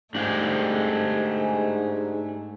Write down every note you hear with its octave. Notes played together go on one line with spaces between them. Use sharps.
G#2 A3 D4 G4 G#4